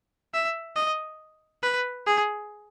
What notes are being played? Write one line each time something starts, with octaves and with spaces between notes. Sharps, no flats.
E5
D#5
B4
G#4